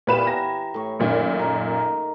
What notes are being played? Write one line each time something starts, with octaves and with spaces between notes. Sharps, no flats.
A#2 E3 B3 G4 B4 E7
G#5 A#5 A#6
A2 C#6
F#2 A#2 D#3
D#4 A#4